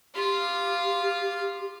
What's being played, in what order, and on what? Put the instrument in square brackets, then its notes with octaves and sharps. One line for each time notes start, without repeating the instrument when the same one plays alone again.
[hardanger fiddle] F4 F5 [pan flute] G4